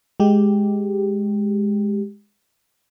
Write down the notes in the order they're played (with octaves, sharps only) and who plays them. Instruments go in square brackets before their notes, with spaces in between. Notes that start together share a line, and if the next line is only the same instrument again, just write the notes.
[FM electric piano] G#3 G4